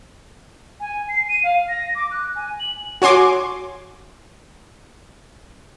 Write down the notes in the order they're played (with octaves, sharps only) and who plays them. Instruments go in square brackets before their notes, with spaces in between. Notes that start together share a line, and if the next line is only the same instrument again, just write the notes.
[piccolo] G#5
C7
D#7
F5
A#6
D6
F#6
G#5
F#7
[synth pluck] F#4 C#5 G#5 C6 D6